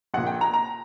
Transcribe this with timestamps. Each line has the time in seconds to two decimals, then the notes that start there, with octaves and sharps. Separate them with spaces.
0.14 A#1 A#2 F#5
0.27 G5
0.41 A#5
0.54 A#5